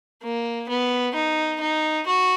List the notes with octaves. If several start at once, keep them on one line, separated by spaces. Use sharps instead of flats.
A#3
B3
D#4
D#4
F#4